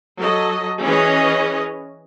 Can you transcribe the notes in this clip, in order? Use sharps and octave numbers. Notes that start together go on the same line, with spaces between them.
F#3 A4 D#5
E3 C#4 G#4 B4 C#5 D#5